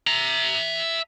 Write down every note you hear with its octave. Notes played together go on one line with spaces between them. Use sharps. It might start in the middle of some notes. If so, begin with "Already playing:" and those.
E5 A#5